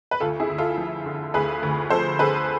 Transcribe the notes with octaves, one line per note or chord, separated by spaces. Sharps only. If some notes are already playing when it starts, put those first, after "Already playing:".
B4
D2 F4 A4
E4 G#4
D2
F4 A4
F3
D3
D2 G#4 B4
D2
F3 A4 C5
D3 G#4 B4